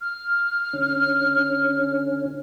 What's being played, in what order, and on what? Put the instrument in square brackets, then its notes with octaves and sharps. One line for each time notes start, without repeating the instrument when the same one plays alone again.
[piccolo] F6
[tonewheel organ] D3 C#4